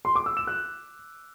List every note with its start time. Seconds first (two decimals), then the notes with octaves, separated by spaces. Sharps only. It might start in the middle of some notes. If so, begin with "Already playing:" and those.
0.05 C6
0.15 D6
0.26 E6
0.37 E7
0.47 F#6